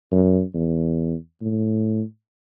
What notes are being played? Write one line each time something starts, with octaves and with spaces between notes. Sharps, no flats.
F#2
E2
A2